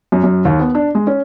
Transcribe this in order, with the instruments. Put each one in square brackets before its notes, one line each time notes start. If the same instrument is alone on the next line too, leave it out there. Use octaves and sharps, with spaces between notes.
[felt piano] F#2
F#2
D#2
B3
D4
G#3
C#4